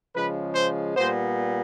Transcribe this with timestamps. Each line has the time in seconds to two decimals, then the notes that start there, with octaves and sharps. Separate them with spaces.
0.15 C#3 F3 G#3 B4
0.55 C5
0.95 A#2 G3 B3 C5